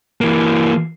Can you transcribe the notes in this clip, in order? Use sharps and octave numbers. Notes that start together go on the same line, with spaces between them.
E3 A#3